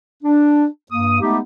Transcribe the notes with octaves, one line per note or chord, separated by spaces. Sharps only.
D4
G2 A#3 D#6
G#3 A3 B3 D#4 G4